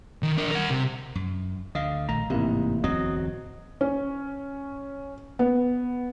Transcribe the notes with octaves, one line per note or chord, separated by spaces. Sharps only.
D#3
D4 A#4
A#4 F#5
C3
F#2
D2 D3 D#5 F5
A#1 D#3 A3 A#5
A1 G#2 C3 A#3 E4
D1 E2 F#3 C4 D#5
C#4
B3